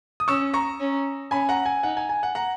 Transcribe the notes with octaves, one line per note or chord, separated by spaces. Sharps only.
D#6
C#4 C#6 E6
A#5 C#6
C#4
C#4 G#5 B5
F#5 A#5
G#5
D#4 F#5
G#5
G#5
F#5
F#5 A#5